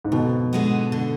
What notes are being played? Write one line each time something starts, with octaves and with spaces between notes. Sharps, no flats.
G#2
F2 B2
D3 G#3 B3
D3